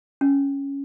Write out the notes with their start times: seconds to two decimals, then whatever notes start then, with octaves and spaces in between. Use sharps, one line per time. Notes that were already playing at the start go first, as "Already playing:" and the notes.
0.21 C#4